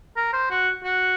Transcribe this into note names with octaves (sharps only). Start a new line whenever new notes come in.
A#4
C5
F#4
F#4